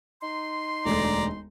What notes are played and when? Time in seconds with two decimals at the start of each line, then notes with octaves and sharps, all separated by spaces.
0.22 D#4 C6
0.86 E1 D2 A3 D5 A#5